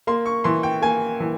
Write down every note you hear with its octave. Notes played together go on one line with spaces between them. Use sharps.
A#3 C6
C#6
E3 C6
G5
A#3 G#5
E3